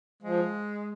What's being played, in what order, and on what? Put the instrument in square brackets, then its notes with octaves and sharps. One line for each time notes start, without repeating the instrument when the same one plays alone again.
[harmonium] F3 [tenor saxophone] G#3